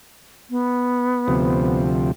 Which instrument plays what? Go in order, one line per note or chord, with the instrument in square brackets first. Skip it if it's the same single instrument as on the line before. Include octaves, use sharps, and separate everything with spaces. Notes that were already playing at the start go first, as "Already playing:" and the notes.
[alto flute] B3
[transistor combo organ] D2 C3 F3